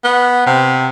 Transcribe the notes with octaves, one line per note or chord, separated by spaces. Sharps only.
B3
C3